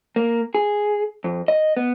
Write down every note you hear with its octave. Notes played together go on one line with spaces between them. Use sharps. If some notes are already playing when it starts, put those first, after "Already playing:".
A#3
G#4
F2
D#5
B3